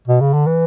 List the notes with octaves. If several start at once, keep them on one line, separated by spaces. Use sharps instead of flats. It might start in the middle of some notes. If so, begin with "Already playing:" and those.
B2
C#3
D3
E3